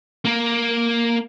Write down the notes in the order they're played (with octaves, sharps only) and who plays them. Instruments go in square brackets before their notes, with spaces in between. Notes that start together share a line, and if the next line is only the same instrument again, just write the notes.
[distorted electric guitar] A#3 A#4